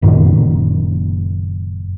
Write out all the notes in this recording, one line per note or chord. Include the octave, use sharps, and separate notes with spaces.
F#1 F#2 A#2 D#3